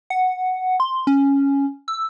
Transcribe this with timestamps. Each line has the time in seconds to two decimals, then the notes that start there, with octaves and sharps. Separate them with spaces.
0.10 F#5
0.80 C6
1.07 C#4
1.88 E6